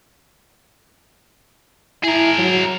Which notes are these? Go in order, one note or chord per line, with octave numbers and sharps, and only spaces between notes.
E4 G#4 A#4
F#3